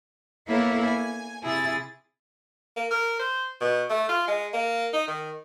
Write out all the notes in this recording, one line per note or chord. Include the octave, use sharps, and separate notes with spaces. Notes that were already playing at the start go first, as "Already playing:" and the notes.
A#3 B3 E4 A4 C#5 A#5
G#5
C3 E4 G#4 A6
A#3
A#4
C5
B2
A3
F4
G#3
A#3
D#4
D#3